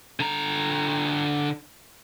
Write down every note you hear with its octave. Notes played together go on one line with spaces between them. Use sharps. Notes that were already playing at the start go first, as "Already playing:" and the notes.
D3 A#5